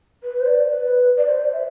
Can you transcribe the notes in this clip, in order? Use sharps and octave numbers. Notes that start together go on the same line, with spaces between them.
B4
C5
D5
B4
D5
C5
D5
E5